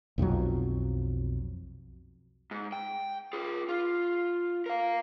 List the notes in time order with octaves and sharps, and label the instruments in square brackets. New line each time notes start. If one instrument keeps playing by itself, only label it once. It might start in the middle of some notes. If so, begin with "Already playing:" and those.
[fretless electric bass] B1 F2 F3 F#3
[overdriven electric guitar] G#2
G5
F4 G#4
F4
A#4 F5